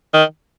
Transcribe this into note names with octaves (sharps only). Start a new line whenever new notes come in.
D#3